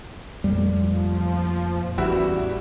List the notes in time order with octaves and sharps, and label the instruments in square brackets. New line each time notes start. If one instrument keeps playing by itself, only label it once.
[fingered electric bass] F2 A#2 A3 [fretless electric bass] G3
[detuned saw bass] F3
[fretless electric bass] A1 [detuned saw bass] E2 [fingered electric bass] E3 [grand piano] G3 E4 F#4